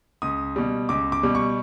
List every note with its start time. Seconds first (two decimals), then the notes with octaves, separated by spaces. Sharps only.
0.22 C#2 D#6
0.56 B2 G3
0.89 C#2 D6
1.12 D6
1.23 B2 G3
1.35 C#6